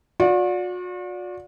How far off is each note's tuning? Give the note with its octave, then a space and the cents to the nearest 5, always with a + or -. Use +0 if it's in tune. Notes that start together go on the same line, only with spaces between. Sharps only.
F#4 -45 D5 -15